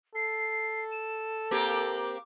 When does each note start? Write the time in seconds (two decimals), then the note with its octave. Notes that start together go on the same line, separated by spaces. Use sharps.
0.15 A4 C7
0.91 E7
1.51 A#3 C4 G4 D6